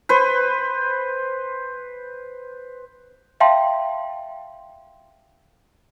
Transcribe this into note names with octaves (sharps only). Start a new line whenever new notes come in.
B4 C5
E5 F5 G5 A5 C6